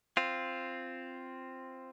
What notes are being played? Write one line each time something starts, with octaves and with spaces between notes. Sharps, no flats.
C4 F4